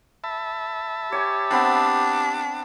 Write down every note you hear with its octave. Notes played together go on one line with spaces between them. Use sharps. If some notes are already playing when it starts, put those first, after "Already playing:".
E5 A5 B5
G4 C#5 G#5 C#6
B3 C4 D4